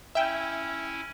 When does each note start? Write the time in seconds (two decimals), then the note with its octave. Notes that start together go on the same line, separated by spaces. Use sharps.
0.15 C#4 E4 E5 G5